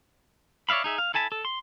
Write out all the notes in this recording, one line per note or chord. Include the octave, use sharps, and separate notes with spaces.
C#5 D5 E5 F5 B5
D#4 G#4 E5
F5
E4 A4 G#5 A5 B5
A4
C6